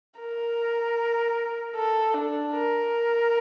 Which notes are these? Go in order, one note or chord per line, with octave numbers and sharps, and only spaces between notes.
A#4
A4
D4
A#4